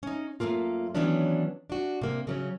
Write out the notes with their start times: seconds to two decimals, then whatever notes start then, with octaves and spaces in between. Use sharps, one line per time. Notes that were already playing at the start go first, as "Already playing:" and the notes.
0.03 C#4 D#4
0.40 F#2 F3 A3 A#3 F4
0.95 D#3 E3 F#3 B3 C#4 D4
1.70 D4 F#4
2.01 C3 A#3
2.27 C#3 F#3 C#4